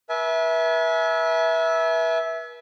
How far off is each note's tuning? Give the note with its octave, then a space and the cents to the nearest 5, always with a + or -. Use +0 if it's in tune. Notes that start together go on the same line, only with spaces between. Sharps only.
B4 -40 E5 -10 G#5 +40